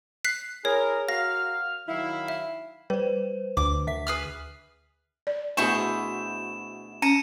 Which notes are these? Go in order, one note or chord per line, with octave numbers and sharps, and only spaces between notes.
F#6 B6 C7
E4 G#4 A#4 C#5
F#4 A#4 F5 F6 A#6
D#3 F#3 E4 F5
E5
G3 B4 C5
D2 D6
D3 E5 B6
G#4 B4 F6
D5
D2 B2 E4 G#4 C5 C#6 E7
C#4 A#5 C#7 D#7 E7